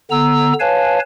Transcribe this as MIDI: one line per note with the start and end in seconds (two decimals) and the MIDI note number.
0.11 0.53 50
0.11 0.53 59
0.11 0.53 82
0.11 0.53 88
0.60 0.99 71
0.60 0.99 73
0.60 0.99 77
0.60 0.99 80
0.60 0.99 81